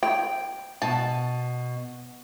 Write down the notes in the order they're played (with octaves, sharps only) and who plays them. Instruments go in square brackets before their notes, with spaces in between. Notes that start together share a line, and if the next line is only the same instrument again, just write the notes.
[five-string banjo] G5
[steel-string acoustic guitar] B2 [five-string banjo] A5